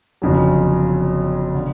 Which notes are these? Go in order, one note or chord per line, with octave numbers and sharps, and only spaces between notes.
G1 F2 C#3 F#3
D3